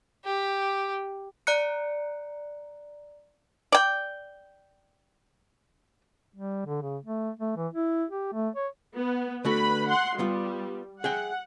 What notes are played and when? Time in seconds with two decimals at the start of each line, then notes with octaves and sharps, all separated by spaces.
0.25 G4
1.47 D5 A#5 F#6 C#7
3.72 D5 G5
6.34 G3
6.66 D3
6.82 C#3
7.05 A3
7.40 A3
7.57 E3
7.74 E4
8.09 G4
8.33 A3
8.56 C#5
8.97 B3
9.45 D3 A3 F#4 B4 B5
9.88 F#5 C6
10.19 G3 B3 F4
11.04 G#4 E5 F#5 G5